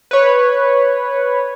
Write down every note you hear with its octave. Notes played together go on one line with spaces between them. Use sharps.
B4 C#5